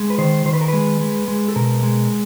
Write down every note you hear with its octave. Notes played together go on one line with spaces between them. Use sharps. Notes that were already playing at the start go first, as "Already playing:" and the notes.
Already playing: G#3
B4
D#3 C5
D#3 C5
B4
A#4
G#3 B4
G#3
G#3
A4
B2 A#4
G#3